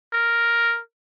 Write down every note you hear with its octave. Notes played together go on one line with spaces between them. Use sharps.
A#4